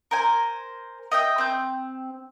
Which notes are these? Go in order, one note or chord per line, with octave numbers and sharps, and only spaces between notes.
A#4 C5 G#5
D#5 E5 G5
C4 G6